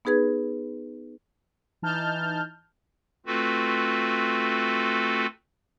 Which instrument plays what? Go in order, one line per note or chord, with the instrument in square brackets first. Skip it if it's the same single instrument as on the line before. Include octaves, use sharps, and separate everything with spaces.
[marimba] B3 D#4 G#4 B4 G#6
[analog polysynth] E3 D#4 A5 F6 G6
[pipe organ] A3 C4 F4 F#4 A4 B4